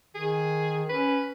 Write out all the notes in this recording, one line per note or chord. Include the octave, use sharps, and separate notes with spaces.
D#3 G#4
C#4 B4